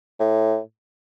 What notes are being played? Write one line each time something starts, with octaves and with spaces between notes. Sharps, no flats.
A2